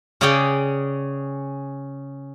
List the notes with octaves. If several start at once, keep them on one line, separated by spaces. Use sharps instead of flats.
C#3 C#4 G#4 D5 G5